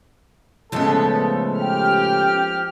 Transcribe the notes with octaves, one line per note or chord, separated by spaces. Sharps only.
A2 C#3 F3 G#3 B3 A4
G4 G5 F6